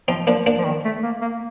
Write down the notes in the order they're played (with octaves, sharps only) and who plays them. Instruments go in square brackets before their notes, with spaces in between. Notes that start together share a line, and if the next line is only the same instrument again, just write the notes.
[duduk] F3 [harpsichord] C4 D#4
[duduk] F3 [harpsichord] A#3 D4
[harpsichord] A#3 D4
[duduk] F3
D#3
A3
A#3
A#3